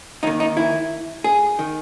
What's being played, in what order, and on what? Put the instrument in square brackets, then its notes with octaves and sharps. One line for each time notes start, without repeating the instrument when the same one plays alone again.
[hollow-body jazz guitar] D#2 D#3 D#4
D#4
E4
G#4
D#3